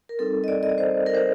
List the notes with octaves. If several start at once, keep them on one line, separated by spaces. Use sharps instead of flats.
A#4
G3 C4 D#4 A4
D#5
D5
D#5
D5
C5
A#4
C5